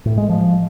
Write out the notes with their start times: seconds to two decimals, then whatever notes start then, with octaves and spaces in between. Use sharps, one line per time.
0.06 A2
0.18 G#3
0.30 F3